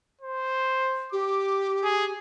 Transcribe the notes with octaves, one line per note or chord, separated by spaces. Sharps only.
C5
G4 D6
G#4